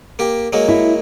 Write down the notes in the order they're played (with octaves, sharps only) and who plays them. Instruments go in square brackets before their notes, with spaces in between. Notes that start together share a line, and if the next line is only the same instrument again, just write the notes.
[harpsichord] A#3 G4
F#3 G#3 A#3
[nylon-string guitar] E4